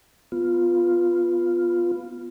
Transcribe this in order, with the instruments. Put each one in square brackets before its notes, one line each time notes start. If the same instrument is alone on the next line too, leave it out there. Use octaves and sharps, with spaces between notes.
[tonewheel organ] B3 F4